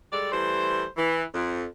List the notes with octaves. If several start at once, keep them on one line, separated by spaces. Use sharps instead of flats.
G3 G#3 A4 D5
E3 G3 A3 C5
E3
F2